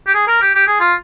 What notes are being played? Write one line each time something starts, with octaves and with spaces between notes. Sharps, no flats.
G4
G#4
A#4
G4
G4
G#4
F4